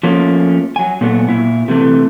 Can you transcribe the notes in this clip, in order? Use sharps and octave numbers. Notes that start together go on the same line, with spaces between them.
F3 A3 A#3 C#4
F#3 G#5
A#2 F#3 A3 B3
A#2 E4
C3 E3 A3